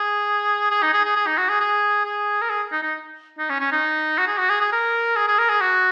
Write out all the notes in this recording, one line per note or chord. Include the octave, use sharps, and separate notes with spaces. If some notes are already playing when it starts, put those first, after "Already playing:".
Already playing: G#4
G#4
D#4
G#4
G#4
G#4
D#4
F#4
G#4
G#4
G#4
A#4
G#4
D#4
D#4
D#4
C#4
C#4
D#4
F#4
G#4
F#4
G#4
G#4
A#4
G#4
G#4
A#4
G#4
F#4